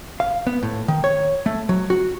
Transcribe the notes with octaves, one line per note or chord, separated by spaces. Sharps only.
F5
B3
A2
D#3
C#5
A3
F#3
F#4